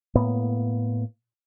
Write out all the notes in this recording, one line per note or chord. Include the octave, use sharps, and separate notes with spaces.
A2 A#3 B3